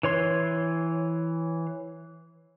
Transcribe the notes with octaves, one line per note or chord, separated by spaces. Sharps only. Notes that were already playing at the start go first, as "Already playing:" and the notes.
E3 C#5 C6